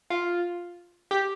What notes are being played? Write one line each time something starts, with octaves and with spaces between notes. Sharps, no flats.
F4
G4